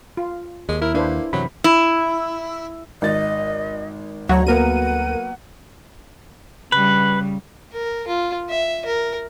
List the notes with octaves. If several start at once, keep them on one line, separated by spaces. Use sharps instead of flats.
F4
D#2 G#3
E4 A#4
A#3 D4 B4 C5
F#2 C3 E3 F#3 B5
E4
G#1 D#5 A6
D2 F#3 F#4 C#5 F#5 A#5
F#3 A#3 B3 A#4 F#5 D#7
C#3 G3 B4
A#4
F4
E5
A#4